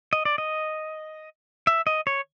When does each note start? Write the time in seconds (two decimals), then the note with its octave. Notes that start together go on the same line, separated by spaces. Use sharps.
0.13 D#5
0.25 D5
0.38 D#5
1.67 E5
1.87 D#5
2.07 C#5